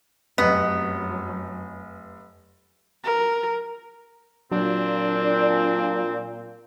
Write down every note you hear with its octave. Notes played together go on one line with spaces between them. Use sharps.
F1 F#2 F#3 B3 D#5
A#4
A#2 F#3 C4 D4